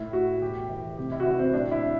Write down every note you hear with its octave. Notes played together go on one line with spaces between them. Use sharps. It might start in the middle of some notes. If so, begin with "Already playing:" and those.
Already playing: A2 E4
A2 F#4
E1 G4
E3
C3 G4
E4
F#4
E3 E4
C4
A2 D4
E4